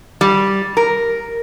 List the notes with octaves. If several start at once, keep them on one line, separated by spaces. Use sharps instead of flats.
G3
A#4